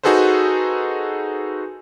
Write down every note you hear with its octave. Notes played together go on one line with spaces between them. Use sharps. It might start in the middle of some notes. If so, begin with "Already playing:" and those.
D#4 F#4 G#4 A4 B4 C5